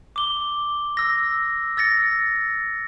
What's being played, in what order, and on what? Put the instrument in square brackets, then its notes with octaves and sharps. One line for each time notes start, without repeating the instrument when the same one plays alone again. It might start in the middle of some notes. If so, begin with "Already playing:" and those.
[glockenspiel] D6 G7
E6 A#6
E6 A6 A#6 C#7